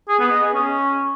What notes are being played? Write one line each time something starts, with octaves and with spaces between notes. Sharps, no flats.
G#4
B3
D#5
G#4
C#4